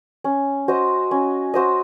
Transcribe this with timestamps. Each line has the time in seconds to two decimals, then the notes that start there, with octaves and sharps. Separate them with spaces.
0.24 C#4
0.68 F#4 C5 D#5
1.11 C#4
1.54 F#4 C5 D#5